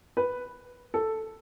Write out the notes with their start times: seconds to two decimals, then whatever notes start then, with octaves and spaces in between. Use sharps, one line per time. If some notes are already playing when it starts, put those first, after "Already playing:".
0.17 B4
0.94 A4